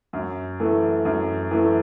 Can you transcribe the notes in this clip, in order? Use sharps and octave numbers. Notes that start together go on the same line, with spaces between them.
F#2
E3 A3
F#2
E3 A3